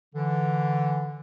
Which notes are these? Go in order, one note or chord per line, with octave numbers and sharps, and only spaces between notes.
D3 E3